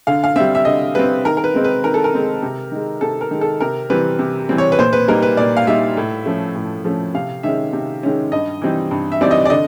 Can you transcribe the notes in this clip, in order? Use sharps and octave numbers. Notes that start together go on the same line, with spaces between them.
D3 F5
F5
G3 C4 E5
E5
D3 D#5
G3 C4 B4
D#3 A#4
A#4
B4
G#3 C4 D#4
B4
D#3 A#4
A4
A#4
G#3 C4 D#4
C3
D#3 G#3
C3 A4
A#4
D#3 G#3
A4
C3 A#4
E3 G3 C4 B4
C3
E3 G3 C4
C#5
B4
A#2 C5
B4
G3 A#3 D#4 A#4
B4
A#2 D5
F5
G3 A#3 D#4 E5
A2
F3 A3 C#4
A2
F3 A3 C#4
C3 F5
D#3 G#3 C#4 E5
C3
D#3 G#3 C#4
G2 D#5
E3 G3 C4 D#4
G2
E5
E3 G3 C4 D#4 D5
D#5
D5
D3 D#5